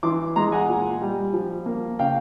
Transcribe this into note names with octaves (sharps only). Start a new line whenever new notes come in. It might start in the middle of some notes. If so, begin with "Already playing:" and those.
E3 C6 D6
G#3 A#5 C6
F#5 G#5
A#2
G3
F3
A#3
C#3 F5 G5